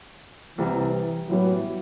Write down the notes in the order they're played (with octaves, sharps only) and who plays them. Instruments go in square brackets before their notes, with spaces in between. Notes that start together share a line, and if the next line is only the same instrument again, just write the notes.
[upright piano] C2 C3 G3 [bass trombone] E3
[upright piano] A2 E3 G3 B3 [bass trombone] F#3